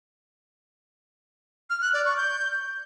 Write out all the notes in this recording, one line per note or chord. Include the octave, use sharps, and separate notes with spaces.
F6
F#6
D5
C#6
G6